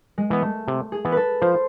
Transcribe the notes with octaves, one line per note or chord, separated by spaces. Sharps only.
G#3
E3 B3
A3
C3
G#4
E3 B3
A4 B4
F3 C5